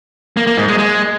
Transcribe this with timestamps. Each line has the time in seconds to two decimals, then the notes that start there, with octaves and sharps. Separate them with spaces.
0.37 A#3
0.47 A#3
0.57 G#2
0.68 G#3
0.78 G#3